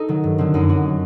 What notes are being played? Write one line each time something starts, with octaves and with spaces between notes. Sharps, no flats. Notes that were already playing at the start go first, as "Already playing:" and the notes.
Already playing: D#4 A4
D#3 F#3
G2
D3 F#3 C4
F#2 D#4
F#3 F#4